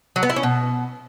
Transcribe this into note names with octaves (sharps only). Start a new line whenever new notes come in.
F#3
B3
E4
C#4
B2